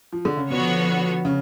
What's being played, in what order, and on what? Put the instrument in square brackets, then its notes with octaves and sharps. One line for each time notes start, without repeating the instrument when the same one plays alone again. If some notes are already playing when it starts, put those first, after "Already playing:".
[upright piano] F3
D3
C#3
[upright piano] B2 [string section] D3 F3 B3 F#4 C#5
[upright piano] C#3